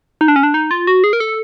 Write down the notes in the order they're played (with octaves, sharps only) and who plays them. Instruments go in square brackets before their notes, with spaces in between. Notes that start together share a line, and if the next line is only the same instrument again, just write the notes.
[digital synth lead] D#4
D4
C#4
D4
D#4
F4
F#4
G#4
A#4
A4